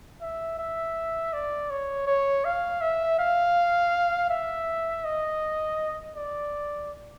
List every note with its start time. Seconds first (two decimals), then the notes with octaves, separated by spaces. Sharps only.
0.21 E5
0.59 E5
1.33 D5
1.70 C#5
2.07 C#5
2.45 F5
2.81 E5
3.19 F5
4.30 E5
5.05 D#5
6.15 D5